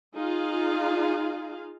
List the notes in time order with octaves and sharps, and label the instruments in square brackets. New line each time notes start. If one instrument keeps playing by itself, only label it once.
[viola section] D#4 F4 G#4 F5